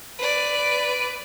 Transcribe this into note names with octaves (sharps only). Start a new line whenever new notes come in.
B4 D5